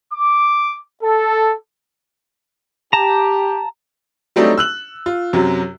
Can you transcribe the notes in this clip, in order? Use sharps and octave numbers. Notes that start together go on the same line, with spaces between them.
D6
A4
G4 A5 A#5
F#3 G3 A3 C4 D4 D#4
E6 F#6 F#7
F4
F#2 C3 F#3